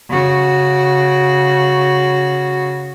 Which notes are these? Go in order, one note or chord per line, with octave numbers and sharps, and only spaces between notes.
C#3 F#4